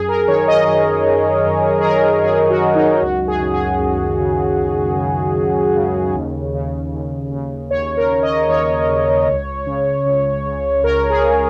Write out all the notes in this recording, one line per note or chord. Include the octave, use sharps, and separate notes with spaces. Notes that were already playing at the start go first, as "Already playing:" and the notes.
Already playing: F#2 G#4
A#4
D#3 C#5
D#5
F#2 D#5
D#3
F#2
G#4
D#3 A#4
F#2 G#4
F#4
D#3
D#4
C#2 F#4
G#4
C#3
G#4
C#2
C#3
C#2
C#3
C#2
C#3
D#2
C#3
D#2
C#3
D#2 C#5
A#4
C#3
D#5
D#2 C#5
C#3
C#2
C#3
C#2
C#3
C#2 A#4
G#4
C#3